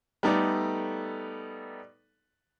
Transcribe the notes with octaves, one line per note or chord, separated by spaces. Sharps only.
G3 A3 B3 D#4 A4 D5